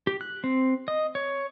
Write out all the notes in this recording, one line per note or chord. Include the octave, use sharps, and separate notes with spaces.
G4
F#6
C4
D#5
C#5